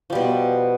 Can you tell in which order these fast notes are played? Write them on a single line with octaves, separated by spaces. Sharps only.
F3 G3 B2